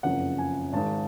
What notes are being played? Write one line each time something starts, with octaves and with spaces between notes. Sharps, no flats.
F#1 F2 C#3 F#5
G#5
G#1 G#2 A5